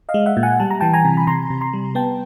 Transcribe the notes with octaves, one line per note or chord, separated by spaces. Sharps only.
D#5 F5
G#3
E5 F#5
A#2
F#5 G#5
G3 A5
A#5
E3 G5 A5
G#5 A#5
C3
B5
C3 A#5 C6
C3
A#5 C6
G3
B3 G5 A5